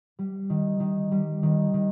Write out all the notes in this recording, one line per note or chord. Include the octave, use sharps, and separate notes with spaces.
G3
D#3
D#3
G3
D#3
D#3